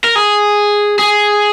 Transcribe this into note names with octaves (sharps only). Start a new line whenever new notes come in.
A#4
G#4
G#4